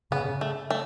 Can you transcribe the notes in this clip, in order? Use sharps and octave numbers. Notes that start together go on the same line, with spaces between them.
C#3 B3
A3
A3